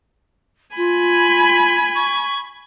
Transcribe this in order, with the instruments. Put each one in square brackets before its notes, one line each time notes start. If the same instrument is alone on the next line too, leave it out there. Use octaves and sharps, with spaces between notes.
[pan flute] F4 [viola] G#5 B5
[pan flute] C#6